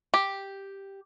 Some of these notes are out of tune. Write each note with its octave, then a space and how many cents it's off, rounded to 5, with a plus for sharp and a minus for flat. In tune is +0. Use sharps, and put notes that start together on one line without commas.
G4 +0